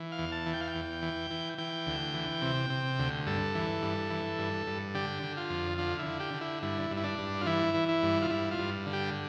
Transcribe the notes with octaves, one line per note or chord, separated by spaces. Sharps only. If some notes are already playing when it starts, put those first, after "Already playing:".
Already playing: E3
F5
E2
A5
E3
G5
F5
G5
E2
E3
E3
E3 G5
D2
E3
C3
C3
D2
G2 A4
E3
G2
E3
G2
G2
D3 G4
D3
F4
F2
D3 F4
E4
D3
G4
D3
E4
G2 E4
G2
E4
D4
G2
F4
E3 E4
E3
E4
G2
F4
G2 E4
F4
G2
D3
G4